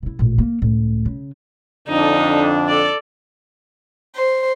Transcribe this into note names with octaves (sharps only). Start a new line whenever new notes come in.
C#3 E4
A1 A#2
A#3
C#2 A2
C#3
F2 D3 D4 D#4
A4 D5
C5